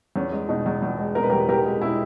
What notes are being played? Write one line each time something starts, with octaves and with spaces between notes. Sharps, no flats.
E2 C#4
G#3
B2 D#4
E2
E2
G#3
B2 A#4
B4
G4 A#4
E2
E2 G4 A#4
G#3
B2 E4 G#4